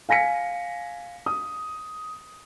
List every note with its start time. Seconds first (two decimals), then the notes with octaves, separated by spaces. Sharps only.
0.09 F5 G#5 A#6 B6 C#7
1.26 D#6